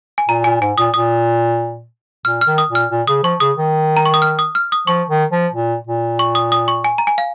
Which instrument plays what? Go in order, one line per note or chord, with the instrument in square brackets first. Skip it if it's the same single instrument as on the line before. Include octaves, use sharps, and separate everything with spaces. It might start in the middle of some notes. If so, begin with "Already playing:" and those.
[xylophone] G#5
[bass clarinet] A#2 [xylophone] A#5
[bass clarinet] A#2 [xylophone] G#5
[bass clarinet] G#2 [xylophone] G#5
[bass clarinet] A#2 [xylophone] D#6
[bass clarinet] A#2 [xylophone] D#6
[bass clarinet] A#2 [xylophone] F6
[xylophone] F6
[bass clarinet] D#3
[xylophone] D#6
[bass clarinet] A#2
[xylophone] F6
[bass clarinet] A#2
[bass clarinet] C#3 [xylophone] D#6
[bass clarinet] F3 [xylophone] C#6
[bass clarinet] C#3 [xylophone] D#6
[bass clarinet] D#3
[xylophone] A#5
C#6
D#6
F6
D#6
F6
D#6
[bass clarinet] F3 [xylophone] C#6
[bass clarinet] D#3
F3
A#2
A#2
[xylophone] C#6
D#6
D#6
C#6
G#5
A#5
G#5
F5